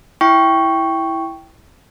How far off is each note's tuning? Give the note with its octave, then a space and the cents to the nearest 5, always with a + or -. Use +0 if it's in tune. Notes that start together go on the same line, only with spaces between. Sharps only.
E4 +0 G5 +0 C#6 +0